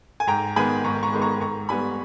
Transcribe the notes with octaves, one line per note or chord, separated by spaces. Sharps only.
G#5
G#2 G5 A#5
D#3 G#3 B3 G#5 B5
G#2 A#5 C#6
A#5 C#6
D#3 G#3 B3
A#5 C#6
G#2 A#5 C#6
G3 B3 G#5 B5